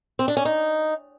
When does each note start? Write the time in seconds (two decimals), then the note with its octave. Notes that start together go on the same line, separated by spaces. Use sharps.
0.19 C4
0.28 D4
0.37 C#4
0.45 D#4